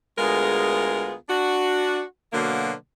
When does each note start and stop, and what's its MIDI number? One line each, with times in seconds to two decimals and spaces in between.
0.18 1.14 38
0.18 1.14 56
0.18 1.14 59
0.18 1.14 65
0.18 1.14 68
0.18 1.14 70
1.29 2.02 62
1.29 2.02 66
2.33 2.73 47
2.33 2.73 50
2.33 2.73 54
2.33 2.73 58